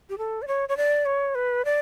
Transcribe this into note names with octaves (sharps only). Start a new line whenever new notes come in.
G4
A4
D5
C#5
C#5
D5
C#5
B4
D5